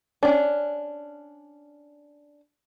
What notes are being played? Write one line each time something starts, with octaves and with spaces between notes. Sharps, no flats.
C#4 D4